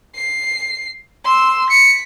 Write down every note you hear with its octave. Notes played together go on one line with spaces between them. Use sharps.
C7
C6 E6
B6 C#7